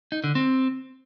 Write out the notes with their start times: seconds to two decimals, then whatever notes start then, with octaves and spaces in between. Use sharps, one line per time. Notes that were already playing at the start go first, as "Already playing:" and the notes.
0.12 D#4
0.24 D3
0.35 C4